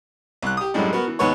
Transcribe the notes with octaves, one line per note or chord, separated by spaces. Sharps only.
C2 F#6
G4 D#6
F#2 A2 D3 G3 G#3 D4
B3 F#4 A#4
E3
D#2 G#2 B3 C#5